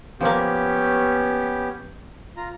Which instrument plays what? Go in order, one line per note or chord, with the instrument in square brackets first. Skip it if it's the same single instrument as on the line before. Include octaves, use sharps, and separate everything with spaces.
[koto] F3 A#3 [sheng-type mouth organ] B3 C#4 G4
[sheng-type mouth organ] F4 A#5